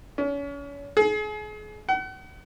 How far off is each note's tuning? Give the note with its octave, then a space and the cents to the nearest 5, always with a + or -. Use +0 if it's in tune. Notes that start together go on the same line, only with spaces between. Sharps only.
C#4 +35
G#4 +35
F#5 +40